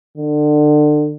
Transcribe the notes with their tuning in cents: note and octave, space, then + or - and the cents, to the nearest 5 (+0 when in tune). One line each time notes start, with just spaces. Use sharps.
D3 +30